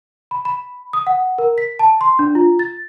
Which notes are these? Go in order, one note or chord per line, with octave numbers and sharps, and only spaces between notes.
B5
B5
D#6
F#5
A#4
B6
A5
C6
D4
F4
A6